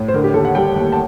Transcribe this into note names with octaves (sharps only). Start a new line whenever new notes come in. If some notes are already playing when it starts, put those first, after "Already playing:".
Already playing: A2
C5
D3 A#4
G4
D#2 A4
F#5
G3 G5
D#2
A5